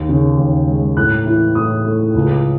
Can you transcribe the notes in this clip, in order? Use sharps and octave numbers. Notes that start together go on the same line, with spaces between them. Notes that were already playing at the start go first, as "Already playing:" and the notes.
Already playing: D#2
C#3
D#2
G#3
A2 F#6
E3
A2 D#6
A3
C#2